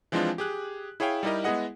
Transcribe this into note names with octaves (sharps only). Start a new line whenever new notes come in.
E3 F3 G#3 C4 D4 F4
G4 G#4 F#6
E4 G#4 C#5 F5 G5
G3 D#4 E4 G4 A#4 D#5
G#3 B3 E4 G#4 D#5 F#5